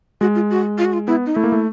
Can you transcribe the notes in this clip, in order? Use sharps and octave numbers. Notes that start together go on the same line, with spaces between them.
G#3 F#4
F4
F#4
F4
F#4
F4
B3 E4
D#4
A3 E4
A#3
A3